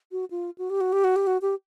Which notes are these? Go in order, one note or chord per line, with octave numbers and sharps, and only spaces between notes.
F#4
F4
F#4
G4
F#4
G4
F#4
G4
F#4
G4